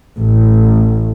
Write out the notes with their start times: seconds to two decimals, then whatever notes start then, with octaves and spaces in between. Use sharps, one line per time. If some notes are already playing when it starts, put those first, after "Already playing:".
0.13 A1